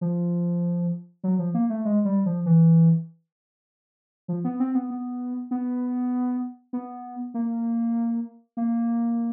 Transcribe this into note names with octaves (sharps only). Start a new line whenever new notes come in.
F3
F#3
F3
A#3
A3
G#3
G3
F3
E3
F3
B3
C4
B3
B3
B3
B3
A#3
A#3